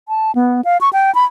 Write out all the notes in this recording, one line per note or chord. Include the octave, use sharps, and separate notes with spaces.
A5
B3
F5
C#6
G5
B5